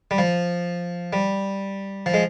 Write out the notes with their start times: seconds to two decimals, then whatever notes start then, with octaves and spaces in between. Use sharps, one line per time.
0.11 G3
0.18 F3
1.13 G3
2.06 F3
2.14 G#3